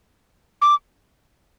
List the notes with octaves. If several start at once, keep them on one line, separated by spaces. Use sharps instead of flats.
D6